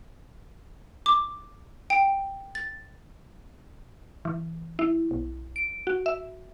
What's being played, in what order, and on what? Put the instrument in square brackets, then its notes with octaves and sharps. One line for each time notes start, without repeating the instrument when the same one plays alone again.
[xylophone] D6
G5
A6
[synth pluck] E3
E4
B1
D7
F#4
E5